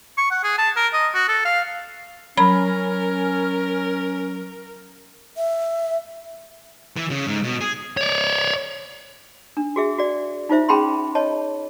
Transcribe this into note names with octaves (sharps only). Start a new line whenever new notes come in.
C#6
F#5
G#4
A5
A#4
D#5
F#4
A4
F5
F#3 C#4 A#4 B5
E5
E3
C#3
G#2
B2
G#4
C#5 D5
D4
F#4 G#4 E5
F#4 D5
D#4 F4 C5 E5
C#4 G#4 G5 A5 B5 C6
C#5 D#5 A5